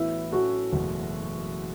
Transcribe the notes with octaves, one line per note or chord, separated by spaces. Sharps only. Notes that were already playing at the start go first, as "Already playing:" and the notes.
Already playing: A1 A2 F#3 B3 E4
A2 F#3 C#4 F#4 A4
F#1 E2 B2 A3